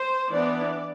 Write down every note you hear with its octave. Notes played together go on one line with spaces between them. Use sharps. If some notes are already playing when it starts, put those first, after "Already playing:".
Already playing: C5
E3 B3 D4 D5